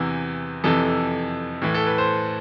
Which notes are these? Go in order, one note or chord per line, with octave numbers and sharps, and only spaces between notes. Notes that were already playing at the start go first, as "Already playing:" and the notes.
Already playing: E2 C3 E3
F2 C3 E3 A4
A2 E3
A4
B4
C5